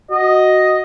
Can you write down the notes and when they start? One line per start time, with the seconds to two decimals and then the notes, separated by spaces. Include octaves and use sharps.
0.11 F#4 D#5